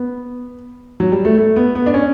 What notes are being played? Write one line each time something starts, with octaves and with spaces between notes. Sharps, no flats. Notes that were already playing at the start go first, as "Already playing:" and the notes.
Already playing: B3
F#3
G3
A3
A3
B3
B3
D4
C#4